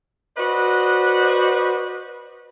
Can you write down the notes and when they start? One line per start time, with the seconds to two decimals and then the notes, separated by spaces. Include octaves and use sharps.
0.37 F#4 B4 C5 D5 D#5